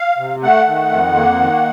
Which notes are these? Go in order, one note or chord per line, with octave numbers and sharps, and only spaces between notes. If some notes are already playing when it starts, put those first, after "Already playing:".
Already playing: F5
C3
A3 F#5
D#3
F2
A#3
D#3